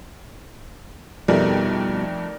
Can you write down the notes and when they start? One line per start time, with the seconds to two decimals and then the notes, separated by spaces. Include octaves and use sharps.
1.28 F2 B2 G3 A3 D#4 A#4 D5